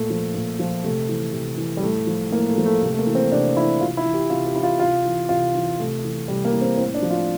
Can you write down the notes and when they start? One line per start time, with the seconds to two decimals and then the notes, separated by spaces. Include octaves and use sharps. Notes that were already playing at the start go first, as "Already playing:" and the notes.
Already playing: A#2 A3
0.10 F3
0.35 A#2
0.59 F3
0.84 C3 A3
1.09 E3
1.33 C3
1.58 E3
1.77 G3
1.82 A2 A3
2.07 F3
2.32 A2 A#3
2.49 A3
2.58 F3
2.65 A3
2.82 C3 A3
2.93 A3
2.99 A#3
3.07 E3
3.15 C4
3.32 C3 D4
3.57 E3 E4
3.81 C3 F4
3.97 E4
4.06 E3
4.14 G4
4.30 C3 F4
4.46 G4
4.55 E3 E4
4.63 F4
4.79 C3 F4
5.05 E3
5.29 C3 F4
5.55 E3
5.79 C3 A3
6.04 E3
6.28 C3 G3
6.45 A#3
6.53 E3
6.61 C4
6.78 A2 C4
6.94 D4
7.03 F3
7.11 F4